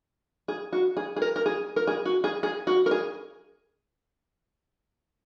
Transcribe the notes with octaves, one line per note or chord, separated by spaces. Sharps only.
G#4
F#4
G#4
G#4
A#4
A#4
G#4
A#4
G#4
F#4
G#4
G#4
F#4
A#4
G#4